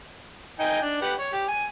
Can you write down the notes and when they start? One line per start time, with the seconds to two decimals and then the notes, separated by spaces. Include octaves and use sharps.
0.60 D#4 G5 G#5
0.82 D4
1.02 G4 B4 F#5
1.18 C#5
1.33 G4
1.48 G#5